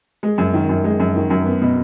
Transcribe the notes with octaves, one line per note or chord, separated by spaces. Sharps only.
G#3
F#2
D#3
F#2
G#3
F#2
D#3
F#2
B3
B2